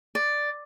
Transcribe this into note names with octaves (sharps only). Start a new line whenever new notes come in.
D5